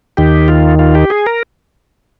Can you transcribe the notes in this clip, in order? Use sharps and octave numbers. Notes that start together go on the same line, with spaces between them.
D#2 D#3 G4
F4
F4
G4
G#4
A#4